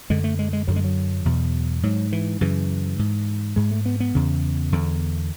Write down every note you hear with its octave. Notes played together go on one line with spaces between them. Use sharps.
F#2 D3 G#3
A3
G#3
G#3
F#2 D3 F#3
G#3
F#3
E2 B2
G#2 F#3
E3
F#2 C#3 E3
G#2
G#2 G#3
A3
B3
B3
E2 C#3
E2 D3